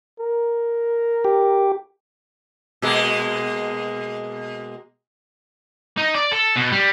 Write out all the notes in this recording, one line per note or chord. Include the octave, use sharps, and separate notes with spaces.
A#4
G4
B2 G#3 A#3
D#4
D5
A4
B2
G3